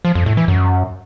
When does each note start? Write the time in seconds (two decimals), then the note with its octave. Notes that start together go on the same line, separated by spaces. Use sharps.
0.05 F3
0.15 F2
0.26 A2
0.37 E3
0.48 F#2